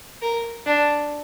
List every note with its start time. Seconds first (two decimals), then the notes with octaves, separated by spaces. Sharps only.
0.22 A#4
0.66 D4